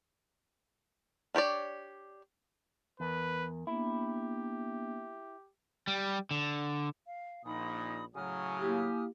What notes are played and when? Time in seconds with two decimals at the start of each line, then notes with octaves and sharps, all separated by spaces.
1.35 D4 G4 C#5 D5
3.00 E2 A#4 B4
3.67 A#3 B3 D4 E4 G4
5.87 G3
6.31 D3
7.07 F5
7.45 A#1 A#2 D#4 B5 D#6
8.15 A2 C#3 F#3 G#5 D#6 F6
8.59 A#3 E4 G4